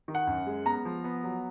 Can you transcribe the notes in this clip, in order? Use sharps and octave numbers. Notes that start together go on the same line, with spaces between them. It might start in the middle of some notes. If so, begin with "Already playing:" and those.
D#3
F#5
F#2
G#3
B3 A#5
F3
B3
F#3